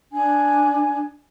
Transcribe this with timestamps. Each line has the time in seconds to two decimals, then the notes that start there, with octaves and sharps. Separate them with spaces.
0.12 D4 G#5